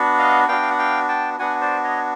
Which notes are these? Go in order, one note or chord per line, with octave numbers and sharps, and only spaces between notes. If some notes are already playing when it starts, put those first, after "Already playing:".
Already playing: B3 D4 F#4
D#5 F5
B3 D4 F#4 F5 G5
F5
F#5
F5 G5
G5 A5
B3 D4 F#4 F#5 G#5
C5 D5
C#5 D#5